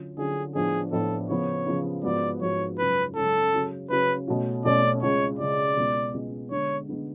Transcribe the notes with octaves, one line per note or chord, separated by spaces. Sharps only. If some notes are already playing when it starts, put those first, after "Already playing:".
Already playing: D3 F#3 C#4 F4
D3 F#3 C#4 F4 G#4
A2 F3 B3 D4 G#4
A2 F3 B3 D4 A4
C#3 F3 B3 C#5
C#3 F3 B3
G#2 F3 B3 F#4 D5
G#2 F3 B3 F#4 C#5
F#2 C#3 G#3 C#4 F4 B4
F#2 C#3 G#3 C#4 F4 A4
C#3 F#3 C#4
C#3 F#3 C#4 B4
B2 A3 C#4 F#4
B2 A3 C#4 F#4 D5
C#2 C#3 G#3 C#5
C#2 C#3 G#3 D5
C#2 B2 G#3 B3
C#2 B2 G#3 B3
D3 G#3 B3 D4 C#5
D3 G#3 B3 D4